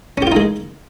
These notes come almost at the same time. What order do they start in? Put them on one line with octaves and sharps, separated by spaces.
C#4 G4 F4 D#4 G#3